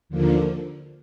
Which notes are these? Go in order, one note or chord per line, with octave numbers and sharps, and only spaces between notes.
D#2 D3 F3 A#3